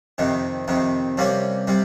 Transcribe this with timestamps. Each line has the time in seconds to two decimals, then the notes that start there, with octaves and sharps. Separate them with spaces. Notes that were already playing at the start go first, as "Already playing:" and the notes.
0.18 F2 C3 D#3
0.68 F2 C3 D#3
1.18 C3 G3 A#3 C#4
1.67 C3 G3